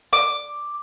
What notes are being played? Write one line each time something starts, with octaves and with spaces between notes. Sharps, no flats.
D6